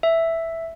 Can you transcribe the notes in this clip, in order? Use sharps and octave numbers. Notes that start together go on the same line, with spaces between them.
E5